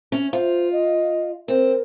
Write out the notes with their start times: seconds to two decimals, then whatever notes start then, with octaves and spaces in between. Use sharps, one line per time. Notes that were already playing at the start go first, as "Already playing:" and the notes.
0.12 C#4
0.33 F4 C5
0.73 D#5
1.48 C4 A#4